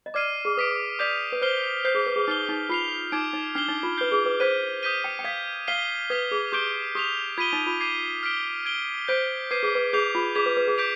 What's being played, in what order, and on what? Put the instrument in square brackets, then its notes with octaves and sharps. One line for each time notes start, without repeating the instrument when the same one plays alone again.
[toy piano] D#5
[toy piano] D5 [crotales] D6 F6 C7 D#7
[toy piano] G#4
[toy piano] B4 [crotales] D#6 B6 D7
[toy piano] D5 [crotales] D6 G6 B6 F7
[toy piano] B4
[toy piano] C5 [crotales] F6 C7 G7
[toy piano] C5 [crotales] G6 C7 G7
[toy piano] G#4
B4
G#4
[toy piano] D#4 [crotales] F6 C7 G7
[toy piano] D#4
[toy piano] F4 [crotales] F6 C7 F7
[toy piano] D#4 [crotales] D6 G#6 D7
[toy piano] D#4
[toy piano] D4 [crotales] F6 C7 G7
[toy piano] D#4
F4
[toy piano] B4 [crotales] G6 C7 G7
[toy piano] G#4
B4
[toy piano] C5 [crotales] G#6 B6 D#7
[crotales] D#6 G6 B6 D#7 G7
[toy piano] G5
G5
[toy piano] F5 [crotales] D#6 G#6 B6
[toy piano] F5 [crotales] F6 C7 D#7 G7
[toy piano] B4 [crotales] D#6 G#6 B6
[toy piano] G#4
[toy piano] G4 [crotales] D6 G6 D7 G7
[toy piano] G4 [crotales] D#6 B6 F7
[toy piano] F4 [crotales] G#6 B6 D#7 G7
[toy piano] D#4
F4
[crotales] D6 G#6 C7 D#7
F6 B6 D7 G7
G#6 D7 G7
[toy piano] C5 [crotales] G6 B6 D7
[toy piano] B4 [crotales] D6 G#6 C7 D#7
[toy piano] G#4
B4
[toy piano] G#4 [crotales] G6 C7 F7
[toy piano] F4
[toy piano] G#4 [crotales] D6 G#6 B6 F7
[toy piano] B4
B4
G#4
[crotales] D6 G6 B6 D7 F7